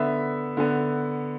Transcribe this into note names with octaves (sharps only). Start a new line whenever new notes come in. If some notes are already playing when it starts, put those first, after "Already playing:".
Already playing: D3 B3 E5
D3 B3